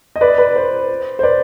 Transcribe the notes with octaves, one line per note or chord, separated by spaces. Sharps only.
D#5
B4 D5
B4
C5
C5
B4 D5